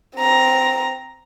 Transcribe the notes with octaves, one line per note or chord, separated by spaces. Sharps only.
C4 A#5